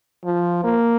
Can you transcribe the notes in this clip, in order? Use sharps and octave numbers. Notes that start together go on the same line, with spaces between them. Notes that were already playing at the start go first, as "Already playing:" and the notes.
F3
A#3